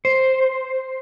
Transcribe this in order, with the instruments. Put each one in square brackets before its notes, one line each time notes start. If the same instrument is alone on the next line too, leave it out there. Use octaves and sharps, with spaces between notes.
[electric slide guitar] C5